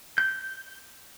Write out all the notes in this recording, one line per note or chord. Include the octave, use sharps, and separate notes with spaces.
G6